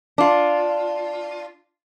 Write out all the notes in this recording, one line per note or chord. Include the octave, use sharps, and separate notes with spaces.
D4 F4